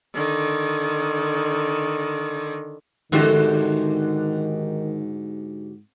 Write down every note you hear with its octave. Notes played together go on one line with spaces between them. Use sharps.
D3 D#3
G#2 D3 D#3 A3 C4 D4 F#4 G4